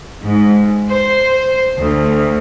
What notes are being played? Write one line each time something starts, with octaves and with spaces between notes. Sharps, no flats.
G#2
C5
D2